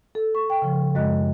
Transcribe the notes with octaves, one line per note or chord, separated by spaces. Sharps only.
A4
C#6
G5
C#3 F3
F#2 G#3 D#5 F#6